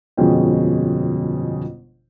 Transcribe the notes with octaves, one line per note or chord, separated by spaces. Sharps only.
G1 F2 B2 G#3 C#4 G5